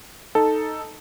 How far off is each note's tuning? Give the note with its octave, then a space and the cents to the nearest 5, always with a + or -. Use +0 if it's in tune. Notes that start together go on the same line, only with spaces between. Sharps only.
D#4 +0 A4 +0